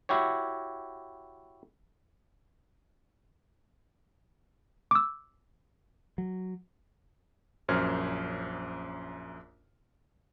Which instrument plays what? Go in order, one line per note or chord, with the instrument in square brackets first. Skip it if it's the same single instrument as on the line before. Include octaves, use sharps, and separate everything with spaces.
[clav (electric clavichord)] E4 F#4 G4 C#5
[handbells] D6 E6
[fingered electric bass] F#3
[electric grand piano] A#1 F#2 C#4 C5 F6 G#6